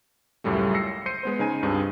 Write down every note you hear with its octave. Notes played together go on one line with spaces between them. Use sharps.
C#2 F#2 A2 G3 A3
E6 A#6 C7 C#7
C5 G6 C7 C#7 D#7
G#3 B3 C5
C#3 D#4 G#5 D#7
C#2 G2 C4 G#4